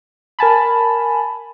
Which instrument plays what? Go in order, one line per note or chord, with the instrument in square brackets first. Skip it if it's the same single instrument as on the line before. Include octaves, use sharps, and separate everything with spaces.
[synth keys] A#4 G#5 A5 B5